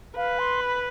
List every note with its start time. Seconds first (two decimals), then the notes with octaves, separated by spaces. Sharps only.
0.16 B4 F5
0.39 C6
0.61 B5